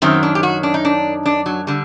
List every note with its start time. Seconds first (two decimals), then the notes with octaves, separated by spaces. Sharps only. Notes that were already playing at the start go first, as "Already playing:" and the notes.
0.02 F#2 D#3 F#3 C4
0.23 D4
0.35 G4
0.43 F#4
0.63 D4
0.74 D#4
0.85 D4
1.26 D4
1.46 F#3
1.67 D3 G3